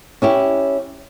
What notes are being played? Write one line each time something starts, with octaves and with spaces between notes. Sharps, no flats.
C#4 E4 G4